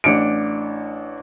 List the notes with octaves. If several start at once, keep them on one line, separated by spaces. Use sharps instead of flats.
A1 D4 C#7 D7